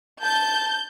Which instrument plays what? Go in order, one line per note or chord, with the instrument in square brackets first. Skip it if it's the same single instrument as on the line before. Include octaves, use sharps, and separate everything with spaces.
[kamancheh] A5 [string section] G6